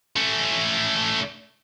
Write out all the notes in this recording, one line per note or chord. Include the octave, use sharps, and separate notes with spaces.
A3 C#4